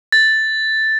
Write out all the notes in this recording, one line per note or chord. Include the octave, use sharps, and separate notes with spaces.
A6